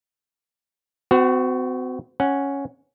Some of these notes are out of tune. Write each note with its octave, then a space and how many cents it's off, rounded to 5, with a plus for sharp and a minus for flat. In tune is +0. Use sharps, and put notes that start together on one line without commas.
C4 -40 F#4 +0
C#4 +0 F#5 +0